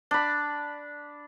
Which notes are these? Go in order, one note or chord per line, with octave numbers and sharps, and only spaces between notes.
D4 B5